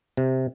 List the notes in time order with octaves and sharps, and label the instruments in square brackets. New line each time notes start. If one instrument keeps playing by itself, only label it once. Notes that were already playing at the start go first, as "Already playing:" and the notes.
[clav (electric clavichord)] C3